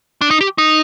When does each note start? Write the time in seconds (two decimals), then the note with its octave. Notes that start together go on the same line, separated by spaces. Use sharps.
0.21 D4
0.31 D#4
0.41 G4
0.58 D#4